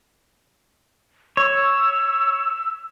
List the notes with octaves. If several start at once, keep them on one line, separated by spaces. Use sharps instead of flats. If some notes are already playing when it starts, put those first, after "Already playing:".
C#5 E6